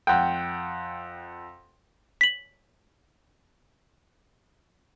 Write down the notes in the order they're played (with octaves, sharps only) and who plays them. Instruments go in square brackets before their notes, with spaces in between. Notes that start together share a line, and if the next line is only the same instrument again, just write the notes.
[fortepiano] F2 F#5 G5
[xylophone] B6 F#7